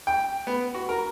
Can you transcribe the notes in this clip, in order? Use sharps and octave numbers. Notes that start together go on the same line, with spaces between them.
G5
B3
F#4
A#4